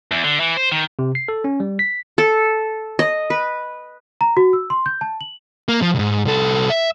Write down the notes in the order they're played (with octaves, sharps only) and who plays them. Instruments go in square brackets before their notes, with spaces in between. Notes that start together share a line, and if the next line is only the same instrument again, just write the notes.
[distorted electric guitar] E2
D3
E3
C5
D#3
[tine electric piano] C3
C7
A4
C#4
G3
B6
[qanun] A4
D#5
B4
[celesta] A#5
F#4
E6
C6
G6
A5
F#7
[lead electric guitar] A#3
F3
C2 G#2
C2 A4
E5